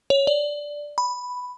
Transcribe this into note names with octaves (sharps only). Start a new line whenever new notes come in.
C#5
D5
B5